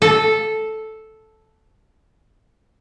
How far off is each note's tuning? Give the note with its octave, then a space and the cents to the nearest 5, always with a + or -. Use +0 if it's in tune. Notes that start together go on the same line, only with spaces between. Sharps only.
A4 -5